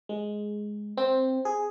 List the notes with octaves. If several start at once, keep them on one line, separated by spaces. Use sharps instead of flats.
G#3
C4
G#4